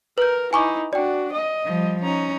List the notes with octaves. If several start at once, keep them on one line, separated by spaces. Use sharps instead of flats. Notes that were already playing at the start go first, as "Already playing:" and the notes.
A#4 B4 G6
D#4 E4 G#5 C#6 D6
D4 F#4 D5 G5
D#5
F3 G3
C#4 D#4 A#5